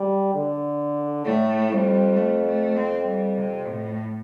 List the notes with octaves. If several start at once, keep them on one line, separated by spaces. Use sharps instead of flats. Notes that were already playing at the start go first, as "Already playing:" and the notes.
Already playing: G3
D3
A2 A3
F2 G3
A3
A3
C4
G3
C3
A2